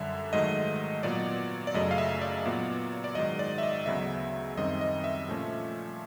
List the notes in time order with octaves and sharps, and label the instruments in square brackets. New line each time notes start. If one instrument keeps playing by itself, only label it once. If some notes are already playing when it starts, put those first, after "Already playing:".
Already playing: [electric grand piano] F#2 D3 G3 E5
G#2 D#3 F#3 A3 D#5
A#2 F#3 B3 D5
D5
F#2 C#3 F#3 A3 D#5
F5
E5
D5
A#2 F#3 B3
D5
G#2 D#3 F#3 D#5
D5
E5
D#5
D2 C#3 F#3 B3 E5
F#2 D#3 G3 C4 D#5
D#5
E5
A#2 F3 A3 C#4